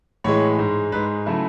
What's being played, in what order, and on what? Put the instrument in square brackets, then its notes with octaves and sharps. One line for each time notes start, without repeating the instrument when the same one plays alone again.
[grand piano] A2 E3 G#3 C#5
G#2 G#3
G#2 G#3 B4
C#3 F#3 A3 E4